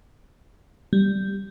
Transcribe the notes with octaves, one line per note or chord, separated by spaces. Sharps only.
G3